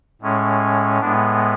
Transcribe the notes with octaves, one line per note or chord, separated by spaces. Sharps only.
A2 G#3 C#4
A2 G#3 B3 D4